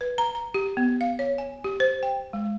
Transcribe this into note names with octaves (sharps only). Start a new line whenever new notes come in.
B4
A#5
A#5
G4
B3
F5
C#5
G#5
G4
C5
G5
G#3